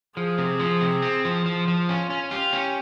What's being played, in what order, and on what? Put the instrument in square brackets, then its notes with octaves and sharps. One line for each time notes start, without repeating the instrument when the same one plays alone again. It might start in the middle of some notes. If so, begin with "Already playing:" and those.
[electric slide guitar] F3 [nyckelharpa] G#4
[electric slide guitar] C3
F3
C3
C4
F3
F3
F3
[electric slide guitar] C#4 [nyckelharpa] F4
[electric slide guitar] C#4
[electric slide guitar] F4 [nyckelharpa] G4
[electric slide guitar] C#4